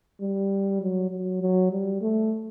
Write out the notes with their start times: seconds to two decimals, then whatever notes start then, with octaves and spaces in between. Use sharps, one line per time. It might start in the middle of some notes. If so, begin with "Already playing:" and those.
0.21 G3
0.81 F#3
1.11 F#3
1.42 F#3
1.71 G3
2.02 A3